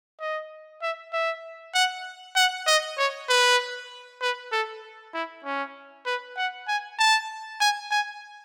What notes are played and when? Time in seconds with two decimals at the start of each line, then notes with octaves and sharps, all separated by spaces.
0.20 D#5
0.82 E5
1.13 E5
1.75 F#5
2.36 F#5
2.67 D#5
2.98 C#5
3.29 B4
4.22 B4
4.52 A4
5.14 E4
5.44 C#4
6.06 B4
6.37 F#5
6.68 G#5
6.99 A5
7.61 G#5
7.91 G#5